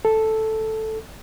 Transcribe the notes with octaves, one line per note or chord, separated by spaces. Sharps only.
A4